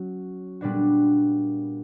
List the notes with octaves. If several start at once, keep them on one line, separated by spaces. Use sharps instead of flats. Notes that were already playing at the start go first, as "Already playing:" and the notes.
Already playing: F#3 C#4 F#4
A#2 G3 B3 D4 F#4